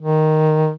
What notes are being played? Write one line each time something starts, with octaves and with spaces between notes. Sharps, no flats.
D#3